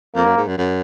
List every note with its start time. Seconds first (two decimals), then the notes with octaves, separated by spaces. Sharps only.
0.15 F2 A#3
0.26 F#2
0.37 G#2
0.47 F#2
0.58 F#2